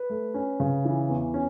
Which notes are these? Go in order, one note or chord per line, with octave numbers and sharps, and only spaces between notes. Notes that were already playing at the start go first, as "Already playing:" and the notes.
Already playing: B4
A3
C#4
C#3
E3
E2
C#4